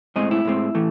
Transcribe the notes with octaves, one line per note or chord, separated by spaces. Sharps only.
A2 G#3 C4 D#5
E4
A2 G#3 C4
A2 E3 A3